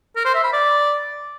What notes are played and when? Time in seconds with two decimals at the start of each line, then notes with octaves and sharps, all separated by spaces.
0.16 A#4
0.25 C5
0.34 E5
0.44 B5
0.53 D5